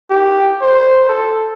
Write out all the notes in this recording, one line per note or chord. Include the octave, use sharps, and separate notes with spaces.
G4
C5
A4